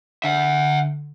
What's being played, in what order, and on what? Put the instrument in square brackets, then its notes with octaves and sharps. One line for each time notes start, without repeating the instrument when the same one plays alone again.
[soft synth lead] D3 [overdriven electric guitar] E5 F#5